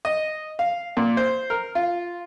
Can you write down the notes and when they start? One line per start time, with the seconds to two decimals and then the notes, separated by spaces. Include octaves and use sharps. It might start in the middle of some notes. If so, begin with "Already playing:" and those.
0.05 D#5
0.59 F5
0.97 A#2
1.17 C5
1.50 A#4
1.75 F4